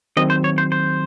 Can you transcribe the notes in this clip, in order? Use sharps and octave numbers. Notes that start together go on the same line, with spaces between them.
D#3 F#3 C4 D#5
C5
C#5
C5
C5